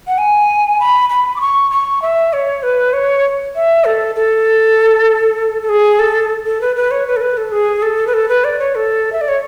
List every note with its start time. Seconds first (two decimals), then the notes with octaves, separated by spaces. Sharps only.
0.07 F#5
0.18 G#5
0.80 B5
1.10 B5
1.36 D6
1.40 C#6
1.71 C#6
2.02 E5
2.33 C#5
2.63 B4
2.93 C#5
3.55 E5
3.85 A4
4.15 A4
5.62 A4
5.69 G#4
5.99 A4
6.46 A4
6.61 B4
6.76 B4
6.91 C#5
7.07 B4
7.16 A4
7.21 B4
7.37 A4
7.52 G#4
7.82 A4
8.07 B4
8.14 A4
8.29 B4
8.44 D5
8.59 C#5
8.75 A4
9.13 E5
9.21 D5
9.28 C#5